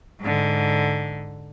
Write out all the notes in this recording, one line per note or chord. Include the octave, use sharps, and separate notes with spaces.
G#2 D3